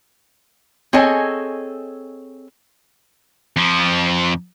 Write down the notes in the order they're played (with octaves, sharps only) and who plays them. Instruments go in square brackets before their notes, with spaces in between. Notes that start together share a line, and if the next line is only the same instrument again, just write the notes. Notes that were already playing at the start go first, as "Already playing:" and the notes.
[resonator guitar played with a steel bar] C4 G#4 A4 C#5 D#5 G#5
[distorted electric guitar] F2 F3